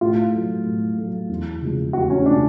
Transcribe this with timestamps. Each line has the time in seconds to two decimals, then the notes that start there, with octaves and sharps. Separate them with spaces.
0.01 A2 F4
0.33 F#3 A3
0.65 A2
0.97 F#3 A3
1.29 E2
1.62 C#3 F3 G#3
1.93 E2 F#4
2.10 C#4
2.26 C#3 F3 G#3 D4